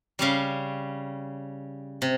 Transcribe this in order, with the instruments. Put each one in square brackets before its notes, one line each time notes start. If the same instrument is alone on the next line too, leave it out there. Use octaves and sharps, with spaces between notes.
[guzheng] C#3 G3 C#4 F5
C3